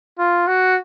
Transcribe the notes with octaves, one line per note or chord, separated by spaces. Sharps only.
F4
F#4